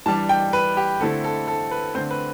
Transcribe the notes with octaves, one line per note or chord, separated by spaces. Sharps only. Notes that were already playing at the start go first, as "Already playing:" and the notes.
E3 G3 D4 A5
G5
B4
G4
D3 A3 C4 E4 A4
A4
A4
B4
D3 A3 C4 C5
B4